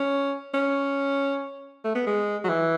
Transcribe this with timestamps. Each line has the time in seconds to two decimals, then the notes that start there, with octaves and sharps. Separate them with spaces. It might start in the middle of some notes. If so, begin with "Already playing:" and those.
Already playing: C#4
0.54 C#4
1.85 A3
1.95 B3
2.07 G#3
2.44 F#3
2.49 E3